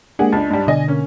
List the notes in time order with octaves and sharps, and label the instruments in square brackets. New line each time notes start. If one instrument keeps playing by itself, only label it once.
[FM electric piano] G#3 A#3 D4 [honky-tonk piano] G4 G#4 F#5
[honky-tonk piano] C#2 [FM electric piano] D4 A5
[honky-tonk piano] G#2 G3
[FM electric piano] B2 D3 [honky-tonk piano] D5 D#5 G#5
[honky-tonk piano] A#3 C#4